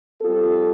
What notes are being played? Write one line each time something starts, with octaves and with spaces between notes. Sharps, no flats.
G3 C4 F4 A4